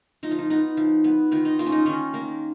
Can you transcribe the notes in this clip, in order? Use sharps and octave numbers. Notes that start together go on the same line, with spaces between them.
F3 D#4
F4
D#4
B3 D#4
F3
B3
D#3 F4
D#4
A#3 F4
C#4
D#4
D#3 C#4
A#3